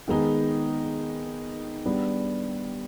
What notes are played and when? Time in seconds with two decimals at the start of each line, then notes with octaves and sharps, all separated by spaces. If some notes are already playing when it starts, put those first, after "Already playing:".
0.08 D#3 G#3 B3 D#4 G#4
1.86 G3 B3 D4